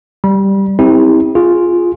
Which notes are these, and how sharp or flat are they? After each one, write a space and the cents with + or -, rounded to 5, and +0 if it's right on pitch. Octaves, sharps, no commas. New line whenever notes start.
G3 +0 B5 -35
C4 +0 E4 -35 G4 +30
F4 +0 G#4 +0